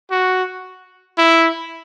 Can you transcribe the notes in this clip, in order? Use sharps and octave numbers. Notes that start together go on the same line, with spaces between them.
F#4
E4